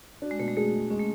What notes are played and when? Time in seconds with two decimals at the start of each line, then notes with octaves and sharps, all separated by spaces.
0.22 D4 F#4
0.31 G#3
0.39 B2 A3
0.48 G#3
0.57 A3 G#4
0.74 G#3
0.90 G#3 C#4
0.99 A3